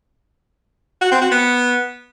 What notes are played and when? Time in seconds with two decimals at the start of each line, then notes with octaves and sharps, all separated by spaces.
1.01 F#4
1.11 C4
1.21 F#4
1.31 B3